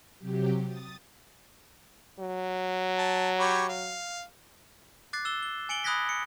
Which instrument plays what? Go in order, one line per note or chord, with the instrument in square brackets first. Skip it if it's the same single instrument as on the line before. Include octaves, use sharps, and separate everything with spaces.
[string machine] C3 F#3 G4
D#6 A6
[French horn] F#3
[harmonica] A5
G4 C#5 B5
F5
[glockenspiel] D6 F#6 A6 C7
E6 E7 G7
G7
G#5 C#7 D7 F#7 G7
B5 D#6 F#6 G#6 A#6 B6
C#7